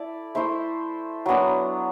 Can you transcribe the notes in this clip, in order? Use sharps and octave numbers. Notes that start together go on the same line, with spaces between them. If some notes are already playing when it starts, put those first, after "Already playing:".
Already playing: E4 A4 D5
A3 E4 C5 E5
F#3 B3 D4